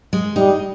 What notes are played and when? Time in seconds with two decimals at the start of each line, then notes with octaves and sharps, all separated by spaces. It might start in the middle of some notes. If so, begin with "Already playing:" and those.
0.13 G#3
0.36 G3 D#4